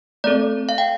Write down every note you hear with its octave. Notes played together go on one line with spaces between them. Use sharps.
A3 C4 A4 D5
F5
G5